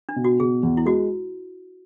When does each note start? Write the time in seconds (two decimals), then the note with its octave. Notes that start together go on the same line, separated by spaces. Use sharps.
0.09 D4
0.16 B2
0.24 F#4
0.40 B2 G#4
0.63 E2
0.77 E4
0.86 G#3 F#4